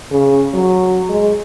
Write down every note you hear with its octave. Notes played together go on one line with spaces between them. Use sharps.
C#3
F#3
G#3